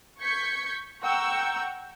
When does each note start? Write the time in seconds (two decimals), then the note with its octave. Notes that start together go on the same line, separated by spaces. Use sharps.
0.20 C#6 G6 G#6 B6 C#7
1.03 F#5 G5 A#5 C#6 E6 G6